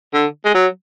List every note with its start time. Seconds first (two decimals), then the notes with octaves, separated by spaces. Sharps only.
0.14 D3
0.45 G#3
0.55 F#3